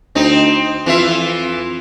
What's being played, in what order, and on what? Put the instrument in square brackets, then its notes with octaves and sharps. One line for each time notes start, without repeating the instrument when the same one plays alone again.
[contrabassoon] D2 [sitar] C4 D#4
[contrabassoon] F2 [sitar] E3 F4 E5